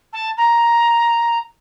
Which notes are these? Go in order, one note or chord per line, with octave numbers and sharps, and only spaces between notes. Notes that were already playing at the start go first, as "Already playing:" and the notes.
A5
A#5